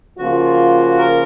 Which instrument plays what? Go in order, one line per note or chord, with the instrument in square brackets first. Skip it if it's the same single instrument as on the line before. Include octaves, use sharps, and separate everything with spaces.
[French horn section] C#3 F3 A#3 F4 [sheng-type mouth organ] F#4
[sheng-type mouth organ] A#4